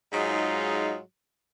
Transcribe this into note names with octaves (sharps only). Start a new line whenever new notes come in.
G#2 F#3 G#3 D#4 F4